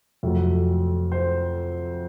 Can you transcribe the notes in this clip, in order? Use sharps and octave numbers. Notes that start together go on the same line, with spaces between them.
F2 C3 F#3 A3
C5